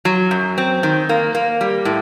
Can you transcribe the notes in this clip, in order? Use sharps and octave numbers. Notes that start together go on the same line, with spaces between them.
F#3
F#2
C4
D#3
A#3
A#3
G3
A2